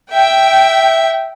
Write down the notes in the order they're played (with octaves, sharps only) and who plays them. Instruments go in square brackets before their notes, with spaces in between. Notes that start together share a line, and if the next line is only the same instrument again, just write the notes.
[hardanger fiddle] E5 [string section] G5